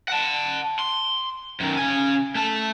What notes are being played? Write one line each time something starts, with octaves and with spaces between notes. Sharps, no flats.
F#5 A5
C6
F#2 D#3
C#3 G#5
A3 A5